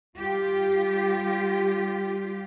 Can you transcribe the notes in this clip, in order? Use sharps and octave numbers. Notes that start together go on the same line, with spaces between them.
G3 F4 G4